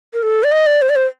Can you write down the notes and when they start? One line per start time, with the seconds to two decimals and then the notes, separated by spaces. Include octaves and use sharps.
0.14 A#4
0.23 A4
0.44 D5
0.52 D#5
0.66 D5
0.82 C5
0.89 D5
0.96 C5